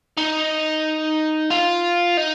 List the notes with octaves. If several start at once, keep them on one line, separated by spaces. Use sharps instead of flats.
D#4
F4
D#4